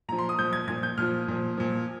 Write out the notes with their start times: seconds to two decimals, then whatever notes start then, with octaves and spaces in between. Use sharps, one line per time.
0.08 A#2 A#5
0.12 F3
0.19 C6
0.29 D#6
0.39 A#2 F3 G6
0.53 G#6
0.67 A#2 F3 G#6
0.83 G6
0.98 A#2 F3 F6
1.28 A#2 F3
1.57 A#2 F3